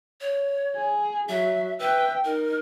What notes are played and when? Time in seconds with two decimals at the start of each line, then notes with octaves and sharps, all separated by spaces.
0.21 C#5
0.75 G#4
1.29 F#3 E5
1.79 B4 E5 G5
2.25 D#4 A#4